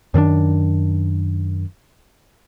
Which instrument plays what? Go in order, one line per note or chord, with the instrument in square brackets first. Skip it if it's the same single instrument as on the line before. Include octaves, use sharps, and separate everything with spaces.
[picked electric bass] F#2 D#3 C4 D4